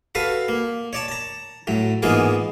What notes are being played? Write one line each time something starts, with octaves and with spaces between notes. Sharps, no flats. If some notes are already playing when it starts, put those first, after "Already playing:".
F#4 A4 B4 F5
A#3
C#5 D5 A5
A5 A#5
A2 F#3
G#2 E3 A#3 B3 F4 G#4